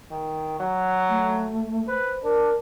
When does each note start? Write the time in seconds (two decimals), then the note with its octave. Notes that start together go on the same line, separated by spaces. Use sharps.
0.11 D#3
0.60 F#3
1.10 A3
1.88 B4 C5
2.24 D4 A#4